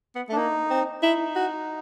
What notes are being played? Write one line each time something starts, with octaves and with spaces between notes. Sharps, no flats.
B3
A3 D4
A#3 D#4
C4
D#4 E4
F#4